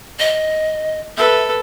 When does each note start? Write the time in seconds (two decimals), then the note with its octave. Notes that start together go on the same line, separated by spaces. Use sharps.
0.19 D#5
1.17 A4 B4 E5